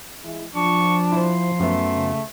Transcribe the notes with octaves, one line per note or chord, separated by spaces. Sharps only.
E3 G#3 E4
F3 D4 C#6
E4 C5 C6
F#2 A3 B3
C#3